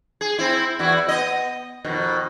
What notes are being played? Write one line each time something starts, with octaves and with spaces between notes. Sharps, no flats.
G#4
C4 E4
E2 E4 F#4
B3 D#5
F2 B2 D#3